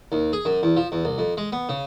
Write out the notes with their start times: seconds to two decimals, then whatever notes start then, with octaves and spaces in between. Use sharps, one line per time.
0.12 D#2
0.33 G#4
0.45 F#2
0.63 E2
0.77 F3
0.92 E2
1.05 C2
1.18 F2
1.37 G#3
1.52 B3
1.69 C#3